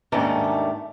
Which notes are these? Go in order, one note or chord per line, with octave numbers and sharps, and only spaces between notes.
D#2 G#2 D#3 A3 C#4 D4